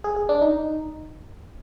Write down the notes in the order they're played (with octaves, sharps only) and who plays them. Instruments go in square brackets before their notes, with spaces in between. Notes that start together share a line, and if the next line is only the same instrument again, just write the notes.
[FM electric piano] G#4
G#4
D4
D#4